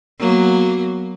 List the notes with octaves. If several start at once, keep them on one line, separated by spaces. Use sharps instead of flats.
F#3 A#3 B3